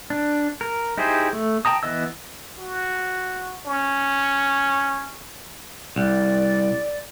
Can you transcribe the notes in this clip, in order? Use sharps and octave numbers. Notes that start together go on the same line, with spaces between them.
D4
A#4
D#4 E4 G4 G#4 C5
A3
G5 A5 A#5 D#6
E3 B3 D#5 E6
F#4
C#4
C2 D5